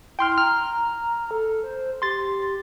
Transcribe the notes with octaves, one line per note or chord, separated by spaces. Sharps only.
E4 G5 C6 F6
A#5 F6
A4
C5
G4 C6 A6